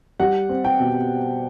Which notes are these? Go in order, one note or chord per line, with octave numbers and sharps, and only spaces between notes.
G3 F#5
C4
G5
B2